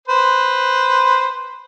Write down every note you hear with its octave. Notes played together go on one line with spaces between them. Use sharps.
B4 C5